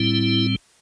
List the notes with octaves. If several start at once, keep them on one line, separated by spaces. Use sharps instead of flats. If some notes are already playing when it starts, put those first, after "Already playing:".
Already playing: A2 G3 C4 E4